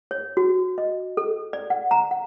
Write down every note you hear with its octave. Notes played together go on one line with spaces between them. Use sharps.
C#5
F#4
D#5
A4
D5
F#5
A#5
F#5